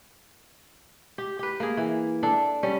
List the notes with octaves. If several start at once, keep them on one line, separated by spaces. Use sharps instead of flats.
G4
G4 B4
A#3 G#4
E3
D4 A4
G3 C#4